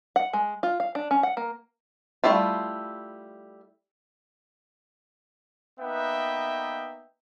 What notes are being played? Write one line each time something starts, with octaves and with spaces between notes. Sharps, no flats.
F#5
G#3
F4
F5
D4
C#4
F#5
A#3
G3 A3 C#4 E4 F4
A#3 B3 D#4 B4 E5 G5